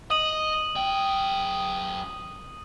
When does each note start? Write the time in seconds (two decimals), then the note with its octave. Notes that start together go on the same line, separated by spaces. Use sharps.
0.10 D#5 D#6 D#7 F#7
0.75 F#2 G5